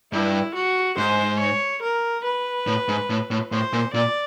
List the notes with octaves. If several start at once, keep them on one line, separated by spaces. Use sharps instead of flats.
G2 E4
F#4
G#2 C5
C#5
A#4
B4
A2
G#2
A2
A2
A2 C5
A#2
A#2 D5